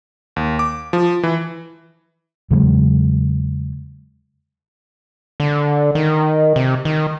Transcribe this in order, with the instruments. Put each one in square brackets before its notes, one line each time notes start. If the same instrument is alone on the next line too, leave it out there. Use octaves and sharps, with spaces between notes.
[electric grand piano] D#2
D6
F3
E3
[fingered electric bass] E2 C#3 F#3 G#3
[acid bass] D3
D#3
C3
D#3